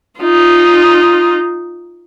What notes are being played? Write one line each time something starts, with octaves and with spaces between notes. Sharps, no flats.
D#4 F4